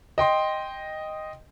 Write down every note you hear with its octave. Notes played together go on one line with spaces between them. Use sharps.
D#5 G5 C6